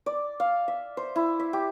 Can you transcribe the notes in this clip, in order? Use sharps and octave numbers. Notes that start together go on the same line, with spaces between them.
D5
F5
E5
C5
E4
E5
G4